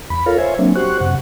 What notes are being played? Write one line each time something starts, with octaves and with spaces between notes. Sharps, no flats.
E2 B5
F4 A4 A#4 C#5 F5
C5 C#5 E5 G#5
F#3 A#3 C4 D4
F#4 G4 C5 C#6 F#6
F#2 C3 F#5